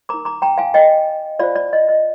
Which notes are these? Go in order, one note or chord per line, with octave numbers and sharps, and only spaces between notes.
D#4 A#4 A#5 D6
A#5 D6
G5 A#5
F5 G#5
D#5 G5
F4 C5 D5 F5
D5
D#5
D#5